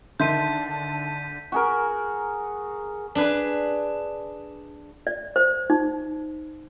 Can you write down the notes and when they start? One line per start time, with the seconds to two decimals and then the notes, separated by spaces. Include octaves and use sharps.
0.20 D3 D#3 E5 A5 C6 G6 B6 D#7
1.52 F#4 G#4 A#4
3.15 D4 G#4 B4
5.07 D5
5.36 C5
5.70 D#4